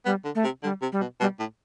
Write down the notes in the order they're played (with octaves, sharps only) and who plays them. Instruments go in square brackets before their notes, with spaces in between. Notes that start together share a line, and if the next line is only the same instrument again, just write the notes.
[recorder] G3 [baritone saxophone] B3
[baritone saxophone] D3
[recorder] A3
[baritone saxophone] C3
[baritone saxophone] D3 [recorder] G3
[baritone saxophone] C3
[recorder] G3
[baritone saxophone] B2
[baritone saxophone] B2 [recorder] G3
[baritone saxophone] A2